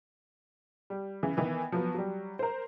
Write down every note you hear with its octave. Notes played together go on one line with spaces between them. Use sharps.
G3
C#3 E3
D#3 E3 B3
F3 F#3 B3 F#4
F#3 G3
A#4 C5